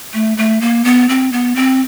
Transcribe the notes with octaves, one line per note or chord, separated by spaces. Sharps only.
A3
A3
A#3
B3
C4
B3
C4